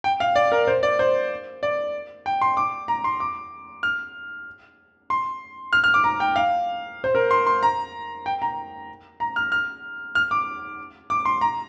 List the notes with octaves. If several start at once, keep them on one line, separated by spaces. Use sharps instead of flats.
G5
F5
D5
A#4
C5
D5
C5
D5
G5
C6
D6
A#5
C6
D6
F6
C6
F6
F6
D6
A#5
G5
F5
C5
A#4
C6
C6
A#5
G5
A#5
A#5
F6
F6
F6
D6
D6
C6
A#5